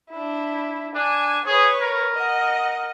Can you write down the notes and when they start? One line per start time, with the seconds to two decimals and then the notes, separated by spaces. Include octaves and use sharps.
0.10 D4 E4
0.95 D4 G#5
1.46 G#4 B4 C#5
1.81 A#4
2.15 D#5 F#5